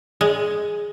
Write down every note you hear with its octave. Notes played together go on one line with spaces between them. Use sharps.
G#3